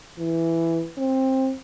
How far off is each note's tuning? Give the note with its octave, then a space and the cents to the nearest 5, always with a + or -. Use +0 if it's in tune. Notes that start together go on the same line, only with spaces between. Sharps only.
E3 +5
C4 +15